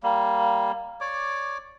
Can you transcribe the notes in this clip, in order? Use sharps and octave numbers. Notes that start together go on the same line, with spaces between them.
G3 A#3
C#5 D5 D6